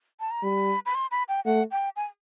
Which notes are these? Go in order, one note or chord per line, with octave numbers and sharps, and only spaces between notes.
A5
A#5
G3 B5
B5
C6
B5
G5
A3 F#5
G5
G#5